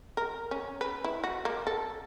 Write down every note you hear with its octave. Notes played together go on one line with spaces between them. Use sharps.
A#4
C#4
B4
E4
F#4
A#3
A4